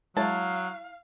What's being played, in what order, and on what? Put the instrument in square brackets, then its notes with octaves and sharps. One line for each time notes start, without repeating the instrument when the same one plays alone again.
[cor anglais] F#3 [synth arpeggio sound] G#3 C#5 [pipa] E4 A5 [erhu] F5